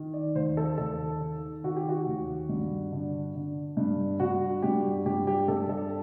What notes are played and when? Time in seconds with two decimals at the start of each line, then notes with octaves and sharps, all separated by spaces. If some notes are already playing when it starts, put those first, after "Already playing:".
Already playing: D#3
0.14 D5
0.35 D#2 C5
0.57 A4
0.78 D#2 A4
1.21 D#3
1.63 D#3 F#4
1.76 G4
1.89 F#4
2.07 D#2
2.49 G2
2.92 D3
3.35 D3
3.77 G2
4.20 G2 F#4
4.62 G2 G4
5.06 G2 G4
5.27 G4
5.48 G2 A4
5.69 A4